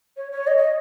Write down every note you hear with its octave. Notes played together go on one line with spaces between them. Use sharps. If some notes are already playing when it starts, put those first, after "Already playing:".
C#5
C#5
D#5
D#5